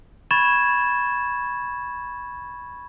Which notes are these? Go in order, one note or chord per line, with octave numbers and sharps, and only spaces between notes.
B5 C#6 G#6 A6 E7